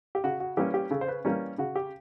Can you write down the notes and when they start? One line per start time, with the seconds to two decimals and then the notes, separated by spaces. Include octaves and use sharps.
0.15 G4
0.24 C#3 F#4
0.40 F#4
0.57 E3 G3 A#3 C#4 G4
0.74 G4
0.91 C#3 A4
1.01 C5
1.08 B4
1.25 E3 G3 A#3 C#4 A#4
1.58 C#3 F#4
1.76 G4